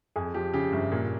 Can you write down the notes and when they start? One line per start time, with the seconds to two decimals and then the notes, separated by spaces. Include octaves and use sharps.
0.16 F2 G#4
0.34 F3 G4
0.53 C#3 G4
0.73 G1
0.91 A#2